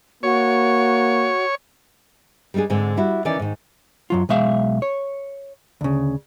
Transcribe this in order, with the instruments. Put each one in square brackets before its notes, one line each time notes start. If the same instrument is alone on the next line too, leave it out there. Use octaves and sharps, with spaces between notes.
[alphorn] A#3 [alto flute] F#4 [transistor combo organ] C#5
[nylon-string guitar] G3 G#3 C4 D4 G#4
G#2 D3 G#3 C4
G3 E4 F#4
D#3 E3 C#4 D5
G#2 D#3
[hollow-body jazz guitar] F#2 F#3 F4
B1 G#3 E5 F5
C#5
D2 C#3